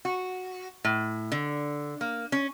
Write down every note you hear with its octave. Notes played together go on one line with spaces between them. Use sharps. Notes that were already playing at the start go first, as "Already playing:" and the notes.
F#4
A2
D3
A#3
C#4